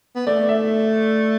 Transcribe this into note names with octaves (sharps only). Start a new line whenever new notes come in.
B3
A3 D5
E5